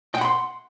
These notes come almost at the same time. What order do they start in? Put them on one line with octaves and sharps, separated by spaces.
G5 F#5 B5 C6